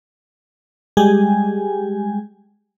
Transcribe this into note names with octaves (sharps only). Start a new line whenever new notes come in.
G3 G#3 G4 G#4 G#5